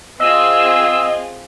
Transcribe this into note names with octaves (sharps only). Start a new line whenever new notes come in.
C4 F4 G#4 D#5 E6